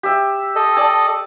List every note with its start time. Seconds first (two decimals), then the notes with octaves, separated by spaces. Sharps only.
0.03 G4 E5
0.56 A4 D#5
0.77 D5 A5